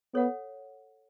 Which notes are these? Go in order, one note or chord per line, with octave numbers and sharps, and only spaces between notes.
B3 A4 C#5 F#5